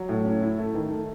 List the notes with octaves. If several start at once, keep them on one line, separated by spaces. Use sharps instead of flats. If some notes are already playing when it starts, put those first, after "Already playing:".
Already playing: F#3
A2
C#4
E4
A3
D#3
A3